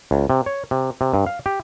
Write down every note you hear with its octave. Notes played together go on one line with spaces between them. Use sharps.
C#2
C3
C#5
C3
C3
G2
F5
G4